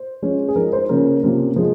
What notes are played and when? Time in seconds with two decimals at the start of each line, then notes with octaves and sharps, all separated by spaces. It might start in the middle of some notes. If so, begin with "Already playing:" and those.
Already playing: C5
0.22 F3 G#3 C#4
0.48 G#4
0.56 F3 G#3 D#4 A#4
0.73 C5
0.89 C#3 F3 A#3 C#4 A#4
1.23 C3 F3 A#3 C#4
1.56 F3 G#3